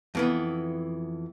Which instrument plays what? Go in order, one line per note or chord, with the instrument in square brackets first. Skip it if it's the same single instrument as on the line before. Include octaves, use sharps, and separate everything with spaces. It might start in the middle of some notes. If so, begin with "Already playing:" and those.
[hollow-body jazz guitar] F2 E3 B3